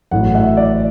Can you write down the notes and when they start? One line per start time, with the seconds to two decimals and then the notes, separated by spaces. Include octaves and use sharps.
0.11 A1 A2 F#3 F#5
0.35 E5
0.57 D5